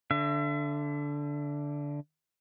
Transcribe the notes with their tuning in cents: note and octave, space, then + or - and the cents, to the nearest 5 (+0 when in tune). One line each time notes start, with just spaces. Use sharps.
D3 -10 E5 +35